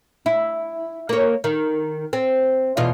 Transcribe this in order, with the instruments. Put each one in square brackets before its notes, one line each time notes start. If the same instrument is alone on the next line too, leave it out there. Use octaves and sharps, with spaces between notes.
[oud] E4
A#3 C#5
D#3
C4
E2 B2 F4